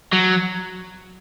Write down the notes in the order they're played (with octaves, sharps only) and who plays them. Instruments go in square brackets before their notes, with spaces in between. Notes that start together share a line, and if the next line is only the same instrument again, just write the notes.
[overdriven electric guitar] F#3